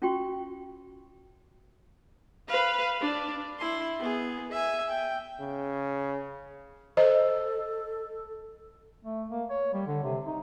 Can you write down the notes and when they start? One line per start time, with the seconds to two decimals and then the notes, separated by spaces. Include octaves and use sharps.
0.02 C#4 F4 F#4 G5 C6 C#6
2.48 B4 F5
3.01 D4
3.59 E4 C6
3.99 B3 G#4
4.51 E5 G#5
4.90 G5
5.41 C#3
6.97 A4 C5 D#5
9.05 A3
9.31 A#3
9.50 C#5
9.74 G3
9.87 D3
10.03 C3
10.26 D#4